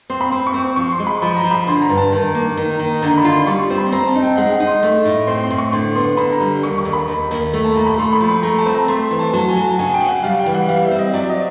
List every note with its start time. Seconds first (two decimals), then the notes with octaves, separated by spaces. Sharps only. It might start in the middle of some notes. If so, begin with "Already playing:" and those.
0.10 C4 C6
0.21 B5
0.31 C4 C6
0.47 C#6
0.54 C4
0.62 C#6
0.76 F3 C#6
0.92 C6
1.00 G#3
1.07 B5
1.22 F3 B5
1.36 A#5
1.44 F3
1.51 B5
1.67 D3 C6
1.82 A#5
1.89 G2
1.97 A5
2.12 D#3
2.35 A#3
2.57 D#3
2.79 D#3
3.02 D3 A#5
3.17 B5
3.24 F4
3.32 C6
3.47 G3 C#6
3.62 C6
3.70 C4
3.78 B5
3.92 C4 A#5
4.07 A5
4.15 D#4
4.22 G5
4.37 G#3 F#5
4.53 F#5
4.60 D#4
4.67 C6
4.83 A3
5.05 A2
5.27 C4 C6
5.43 C6
5.51 A2
5.58 C#6
5.72 D3 C6
5.95 B3 C6
6.17 D3 B5
6.32 A#5
6.41 G3
6.63 D#2 C#6
6.78 C#6
6.85 D#2
6.93 B5
7.08 D#2
7.31 D#2
7.54 A3
7.65 A5
7.76 A#2 A#5
7.87 B5
7.98 A3 C6
8.13 B5
8.21 F3
8.28 B5
8.43 A3 A#5
8.58 A5
8.66 C4 B5
8.74 A#5
8.88 A3 C6
9.03 C6
9.11 E3
9.19 A5
9.33 F#3 A5
9.48 G#5
9.56 F#3
9.64 A5
9.78 C#3 G#5
9.94 G5
10.01 C#3
10.09 F#5
10.23 G3 F5
10.39 G5
10.46 E3
10.54 F#5
10.68 G3 F5
10.83 E5
10.91 C4
10.99 D#5
11.13 F#3 D5
11.29 D#5